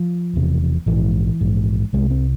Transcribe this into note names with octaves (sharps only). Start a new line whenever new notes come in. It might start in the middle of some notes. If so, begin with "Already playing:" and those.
Already playing: F3
E1 E2 C3
A#1 G#2 E3
A#1 G#2
C2 C3 G#3
C4